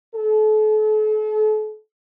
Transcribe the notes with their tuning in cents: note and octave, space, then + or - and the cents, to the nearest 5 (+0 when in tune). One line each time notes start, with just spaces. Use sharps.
A4 -40